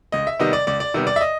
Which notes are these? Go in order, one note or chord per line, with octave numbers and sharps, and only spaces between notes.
C#2 D#5
E5
C3 D#3 G3 B3 D#5
D5
C#2 D5
D5
C3 D#3 G3 B3
D5
E5
D#5